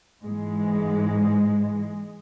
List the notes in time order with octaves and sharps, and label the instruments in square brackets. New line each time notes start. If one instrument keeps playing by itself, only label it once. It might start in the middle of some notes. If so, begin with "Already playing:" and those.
[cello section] G#2 E3 G#3